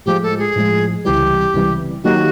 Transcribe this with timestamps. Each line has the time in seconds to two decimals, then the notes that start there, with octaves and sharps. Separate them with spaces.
0.06 A2 F3 G#3 G4
0.23 A4
0.39 G#4
0.56 A2 F3 G#3
1.04 C#2 C3 E3 G3 G4
1.54 C#2 C3 E3 G3
2.03 D#3 F#3 A#3 D#4 F#4 G4